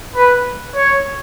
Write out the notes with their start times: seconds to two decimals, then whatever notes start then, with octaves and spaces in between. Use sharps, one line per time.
0.15 B4
0.76 C#5